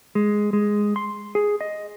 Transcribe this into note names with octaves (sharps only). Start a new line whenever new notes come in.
G#3
G#3
C6
G#4
D#5